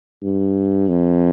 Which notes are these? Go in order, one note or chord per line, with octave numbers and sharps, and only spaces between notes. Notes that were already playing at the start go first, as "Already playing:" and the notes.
G2
F2